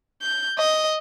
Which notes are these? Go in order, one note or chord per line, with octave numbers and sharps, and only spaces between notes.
G6
D#5